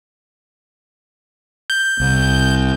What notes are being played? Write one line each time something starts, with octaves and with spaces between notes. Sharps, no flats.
G6
C2